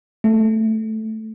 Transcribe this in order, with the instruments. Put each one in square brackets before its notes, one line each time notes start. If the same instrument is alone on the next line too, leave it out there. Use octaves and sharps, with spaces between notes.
[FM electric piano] A3